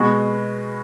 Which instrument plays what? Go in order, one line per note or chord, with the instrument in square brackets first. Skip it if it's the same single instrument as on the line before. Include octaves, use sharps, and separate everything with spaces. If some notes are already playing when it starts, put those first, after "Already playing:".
Already playing: [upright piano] B2 G#3 B3 F#4